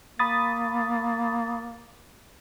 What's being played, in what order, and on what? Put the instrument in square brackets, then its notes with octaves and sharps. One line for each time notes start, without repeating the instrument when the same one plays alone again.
[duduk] A#3 [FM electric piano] B5 D#6 A6